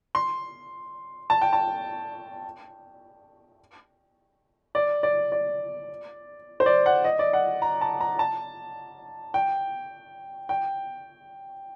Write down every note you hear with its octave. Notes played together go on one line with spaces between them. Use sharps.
C6
A5
G5
A5
D5
D5
D5
C5
D5
F#5
D#5
D5
F#5
A#5
A5
A#5
A5
G5
G5